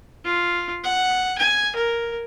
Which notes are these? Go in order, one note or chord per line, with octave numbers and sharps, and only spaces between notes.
F4
F#5
G#5
A#4